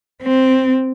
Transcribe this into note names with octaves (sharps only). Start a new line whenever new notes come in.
C4